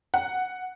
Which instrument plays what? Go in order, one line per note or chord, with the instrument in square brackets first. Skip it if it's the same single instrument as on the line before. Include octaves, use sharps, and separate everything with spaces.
[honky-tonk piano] F#5